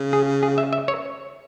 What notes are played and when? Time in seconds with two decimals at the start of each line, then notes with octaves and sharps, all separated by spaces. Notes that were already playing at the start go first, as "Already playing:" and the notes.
Already playing: C#3
0.13 G#4
0.43 G#4
0.58 E5
0.73 E5
0.88 C#5